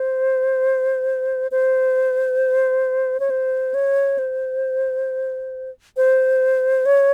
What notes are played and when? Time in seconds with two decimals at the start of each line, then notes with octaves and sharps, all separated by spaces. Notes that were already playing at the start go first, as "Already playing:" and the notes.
Already playing: C5
1.51 C5
3.20 C#5
3.30 C5
3.74 C#5
4.18 C5
5.97 C5
6.86 C#5